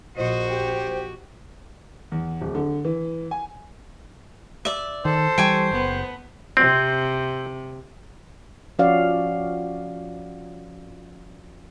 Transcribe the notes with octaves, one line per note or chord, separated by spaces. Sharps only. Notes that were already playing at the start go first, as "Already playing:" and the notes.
A#1 F#4 C5 D#5
G4
E2
D1
D3
E3
G#5
D5 E5
D#3 A4 C5
E3 G3 G5 G#5 C#6
F#1 B3
C3 C4
F3 C#4 F#4 D5 F5